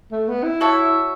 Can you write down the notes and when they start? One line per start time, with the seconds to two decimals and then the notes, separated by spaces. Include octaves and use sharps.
0.12 A3
0.29 B3
0.44 E4
0.61 F#4 C#5 E5 A5